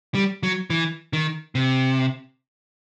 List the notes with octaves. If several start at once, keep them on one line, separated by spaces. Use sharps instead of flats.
G3
F#3
E3
D#3
C3